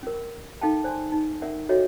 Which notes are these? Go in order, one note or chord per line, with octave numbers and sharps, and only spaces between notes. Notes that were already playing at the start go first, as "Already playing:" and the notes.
C#4 A#4
D#4 A4 F5 G5 A5
C5 D5 G#5 A5 C6
D#4
C#4 A#4 D5 E5 F#5
F#4 A4 C#5 D#5 E5 G5